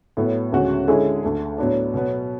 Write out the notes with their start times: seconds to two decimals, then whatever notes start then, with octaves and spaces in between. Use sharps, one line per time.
0.17 A2 F#3 B3
0.52 D2 C#3 G#3 C#4 F#4
0.88 D3 G#3 C#4 E4 G#4
1.23 D2 D3 A3
1.58 A2 F#3 B3 D4
1.94 B2 F#3 B3